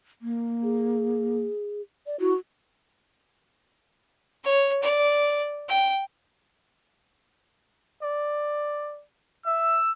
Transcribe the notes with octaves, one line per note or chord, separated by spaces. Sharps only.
A#3
G#4
D5
E4 F#4
C#5
D5
G5
D5
E5 E6